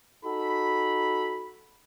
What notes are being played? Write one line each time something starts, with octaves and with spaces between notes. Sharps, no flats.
D#4 F#4 A4 B5